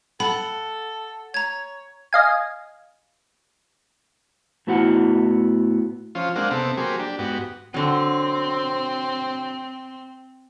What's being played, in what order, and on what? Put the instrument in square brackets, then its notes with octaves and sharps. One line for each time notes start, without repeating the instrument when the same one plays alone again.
[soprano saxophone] A4 [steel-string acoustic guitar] F#5 [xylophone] B5
[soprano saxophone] C#5 [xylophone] A#5 G#6
[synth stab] D#5 F5 G#5
[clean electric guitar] A2 B3 E4 F#4 F#5
[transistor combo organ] F3 C#4 F4 C5
G#3 A#3 C4 D4 F5 F#5
C3 B3 C4 A4
F#3 A#3 G4 G#4 C5
D4 G4
G#2 B3 F#4 G4
[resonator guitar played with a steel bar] D3 F#3 [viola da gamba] C4